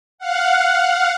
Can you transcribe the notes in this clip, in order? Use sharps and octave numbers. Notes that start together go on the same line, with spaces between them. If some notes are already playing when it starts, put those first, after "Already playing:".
F5 F#5